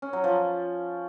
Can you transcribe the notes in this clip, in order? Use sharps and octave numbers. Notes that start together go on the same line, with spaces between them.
C#4
F#3
F3